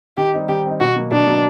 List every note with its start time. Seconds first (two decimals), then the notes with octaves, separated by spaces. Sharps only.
0.17 D#3 G4
0.33 G3 C4 D#4
0.48 D#3 G4
0.64 G3 C4 D#4
0.80 B2 F#4
0.96 F#3 A#3
1.12 B2 D4
1.27 F#3 A#3